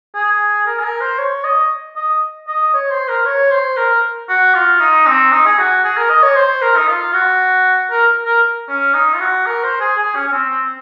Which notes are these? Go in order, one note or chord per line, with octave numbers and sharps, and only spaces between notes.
G#4
A#4
G#4
A#4
C5
C#5
D#5
D#5
D#5
C#5
C5
A#4
C#5
C5
A#4
F#4
F4
D#4
C4
D#4
G#4
F#4
G#4
A#4
D#5
C#5
C5
A#4
D#4
F4
F#4
A#4
A#4
C#4
D#4
F4
F#4
A#4
C5
G#4
G#4
C#4
C#4
C4
C4